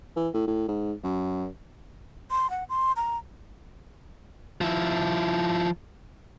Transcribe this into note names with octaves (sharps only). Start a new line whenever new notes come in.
E3
A2
A2
G#2
F#2
C6
F#5
C6
A#5
F3 E4